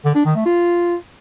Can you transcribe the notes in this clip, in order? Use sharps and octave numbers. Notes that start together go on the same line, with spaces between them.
D3
D4
D#3
A3
F4